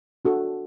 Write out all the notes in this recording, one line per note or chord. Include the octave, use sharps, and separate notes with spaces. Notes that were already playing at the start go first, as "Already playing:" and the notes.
D4 F#4 A4